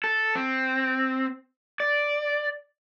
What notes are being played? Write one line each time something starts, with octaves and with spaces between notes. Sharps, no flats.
A4
C4
D5